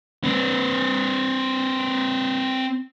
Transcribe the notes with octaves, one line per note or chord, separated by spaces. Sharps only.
C4 B4